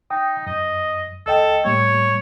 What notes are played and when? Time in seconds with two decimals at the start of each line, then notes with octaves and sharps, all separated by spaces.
0.10 D#4 G5 D#6
0.47 F#2 D#5
1.26 C#2 A4 D#5 G5
1.65 A2 G3 A#3 C#5